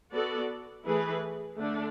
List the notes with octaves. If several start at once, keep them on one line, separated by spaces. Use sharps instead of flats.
B3 F#4 A4 D5
E3 A3 E4 G#4 B4
D3 A3 D4